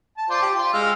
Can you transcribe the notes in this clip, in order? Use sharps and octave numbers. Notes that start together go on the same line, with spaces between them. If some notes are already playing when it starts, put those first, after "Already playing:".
A5
F4 C5 D5
G4
F4
G#3 F5 E6